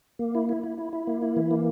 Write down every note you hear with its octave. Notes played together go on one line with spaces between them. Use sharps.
A#3
E4
E4
E4
E4
E4
A#3
E4
E3
A#3